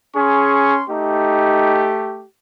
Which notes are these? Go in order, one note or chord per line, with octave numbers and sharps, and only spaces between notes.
C#4 G#4 C6 C#6
A3 D#4 G4